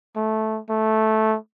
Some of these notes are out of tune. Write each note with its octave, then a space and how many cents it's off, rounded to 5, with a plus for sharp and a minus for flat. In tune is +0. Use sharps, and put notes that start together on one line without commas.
A3 -10
A3 -10